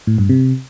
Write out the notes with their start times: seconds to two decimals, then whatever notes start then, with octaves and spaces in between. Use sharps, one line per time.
0.07 A2
0.18 G2
0.29 C3